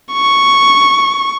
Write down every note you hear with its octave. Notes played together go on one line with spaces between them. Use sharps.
C#6